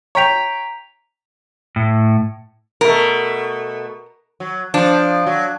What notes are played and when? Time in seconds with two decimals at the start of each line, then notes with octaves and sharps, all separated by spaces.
0.15 C#5 G5 A#5 B6 F7
1.76 A2
2.81 B2 A3 A#4
4.40 F#3
4.74 F3 D4
5.26 F#3